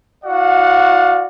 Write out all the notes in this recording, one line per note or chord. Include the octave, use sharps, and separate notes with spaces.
E4 F#4 D5 F5 F#5